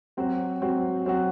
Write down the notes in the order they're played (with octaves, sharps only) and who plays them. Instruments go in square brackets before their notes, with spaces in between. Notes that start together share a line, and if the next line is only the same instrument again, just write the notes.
[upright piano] F#3 C4 F#4
F#3 C4 F#4
F#3 C4 F#4